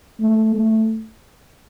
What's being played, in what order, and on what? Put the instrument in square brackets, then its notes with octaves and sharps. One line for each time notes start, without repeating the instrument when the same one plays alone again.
[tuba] A3
A3